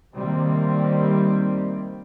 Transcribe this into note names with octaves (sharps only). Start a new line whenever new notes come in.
C3 D#3 G3 A#3 C4